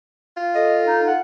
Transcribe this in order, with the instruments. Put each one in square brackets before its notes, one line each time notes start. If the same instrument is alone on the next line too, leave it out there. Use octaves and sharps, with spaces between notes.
[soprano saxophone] F4
[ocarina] A4 [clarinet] D#5
[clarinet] D#4
F#5